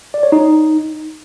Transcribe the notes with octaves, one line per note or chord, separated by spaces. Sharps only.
D5
C#5
D#4